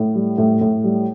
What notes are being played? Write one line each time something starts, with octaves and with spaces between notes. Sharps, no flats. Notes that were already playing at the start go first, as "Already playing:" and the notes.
Already playing: A2
G3
A2
A2
G3